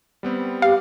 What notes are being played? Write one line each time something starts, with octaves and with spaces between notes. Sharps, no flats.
G3 B3 C4
G4 F5